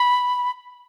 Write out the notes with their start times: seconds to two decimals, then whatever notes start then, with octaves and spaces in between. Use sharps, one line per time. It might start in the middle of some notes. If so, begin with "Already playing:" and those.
Already playing: B5